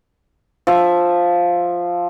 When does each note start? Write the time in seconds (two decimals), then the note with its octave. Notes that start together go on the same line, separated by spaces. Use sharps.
0.67 F3 E5